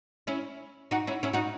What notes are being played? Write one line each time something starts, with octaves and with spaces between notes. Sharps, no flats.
C#4 E4
D#4 F#4
C#4 E4
C#4 E4
D#4 F#4